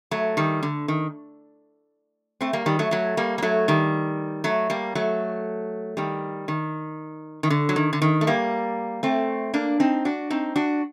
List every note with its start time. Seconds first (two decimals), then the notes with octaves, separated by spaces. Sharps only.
0.11 F#3 A3
0.37 D#3 G3
0.63 D3
0.88 D#3
2.41 A3 C4
2.53 G3 A#3
2.66 D#3 G3
2.79 F#3 A3
2.91 F#3 A3
3.17 G3 A#3
3.38 A#3
3.42 F#3 A3
3.68 D#3 G3
4.44 F#3 A3
4.70 G3 A#3
4.95 F#3 A3
5.97 D#3 G3
6.48 D#3
7.43 D#3
7.50 D3
7.69 F#3
7.76 D#3
7.93 D3
8.02 D#3
8.21 A3
8.27 G3 A#3
9.03 A3 C4
9.54 A#3 D4
9.80 C4 D#4
10.05 D4 F#4
10.30 C4 D#4
10.56 D4 F#4